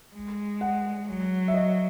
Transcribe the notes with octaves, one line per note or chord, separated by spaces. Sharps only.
G#3
F#5
F#3
E5
D#5